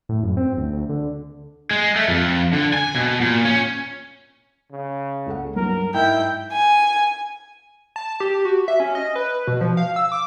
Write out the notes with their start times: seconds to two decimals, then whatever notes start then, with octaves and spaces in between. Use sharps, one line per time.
0.09 A2
0.23 F#2
0.37 C4
0.57 D2
0.73 D2
0.89 D3
1.71 G#3
1.96 A3
2.08 F2
2.53 D3
2.73 G#5
2.95 B2
3.21 A#2
3.45 C#4
4.72 C#3
5.26 C#2 A4 F#5
5.56 G2 F#3 A#4
5.94 G#2 E4 G5
6.53 G#5
7.96 A5
8.20 G4
8.45 F#4
8.68 E5
8.80 C#4
8.95 D#5
9.16 B4
9.47 B2
9.61 F3
9.77 F5
9.96 E6
10.12 D6